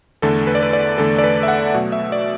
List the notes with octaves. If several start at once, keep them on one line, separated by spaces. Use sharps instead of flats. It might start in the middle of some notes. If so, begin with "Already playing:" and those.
E2 D3 A3 A4
B4
D5
B4
D5
E2 D3 A3 A4
D5
B4
E5
F#5
B2 F#3 A3
E5
D5